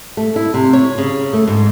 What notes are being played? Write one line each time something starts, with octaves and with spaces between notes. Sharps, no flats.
A3
E4
C3
C#5
C#3
A3
G#2